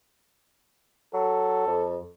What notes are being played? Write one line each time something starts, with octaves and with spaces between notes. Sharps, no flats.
F#3 A4
F2